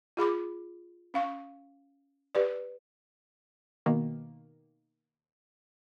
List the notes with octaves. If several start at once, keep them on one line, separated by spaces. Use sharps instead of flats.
F4 G#4 B5 D6
C#4 F5 C#6
G4 B4 D5
B2 D#3 A#3